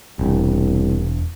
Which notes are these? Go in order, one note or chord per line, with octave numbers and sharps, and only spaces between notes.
E1 C2